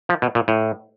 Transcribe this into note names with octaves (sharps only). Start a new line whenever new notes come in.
F3
B2
A#2
A2